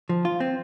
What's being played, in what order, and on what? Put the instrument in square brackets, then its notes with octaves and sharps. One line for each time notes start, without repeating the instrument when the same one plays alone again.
[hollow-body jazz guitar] F3
F4
C4